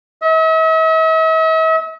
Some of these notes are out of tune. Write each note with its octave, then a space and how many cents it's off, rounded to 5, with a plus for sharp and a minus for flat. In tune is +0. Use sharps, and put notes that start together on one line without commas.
E5 -45